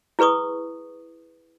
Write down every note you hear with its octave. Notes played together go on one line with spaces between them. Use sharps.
E4 G#4 B4 C#6 D#6